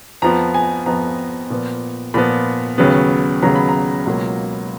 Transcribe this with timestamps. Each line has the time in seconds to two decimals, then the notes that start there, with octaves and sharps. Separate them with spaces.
0.22 F2 F3 B3 A#5
0.54 G#5
0.86 F2 F3 B3 A#5
1.50 A#2 F3 B3
2.14 A#2 F3 B3 B5
2.78 D#2 C#3 F#3 B3
3.42 D#2 C#3 F#3 B3 A#5
3.56 B5
3.69 A#5
4.06 C#2 B2 F#3 A#3